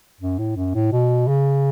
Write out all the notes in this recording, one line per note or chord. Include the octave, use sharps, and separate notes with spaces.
F#2
A2
F#2
A2
B2
C#3